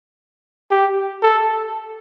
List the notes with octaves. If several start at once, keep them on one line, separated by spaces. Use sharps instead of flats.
G4
A4